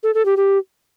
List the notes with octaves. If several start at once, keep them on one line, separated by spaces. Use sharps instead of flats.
A4
A4
G4
G4